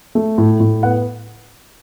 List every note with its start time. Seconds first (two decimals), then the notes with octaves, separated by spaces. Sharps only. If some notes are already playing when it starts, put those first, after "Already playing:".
0.15 A3
0.38 A2
0.60 A2
0.83 B3 F#5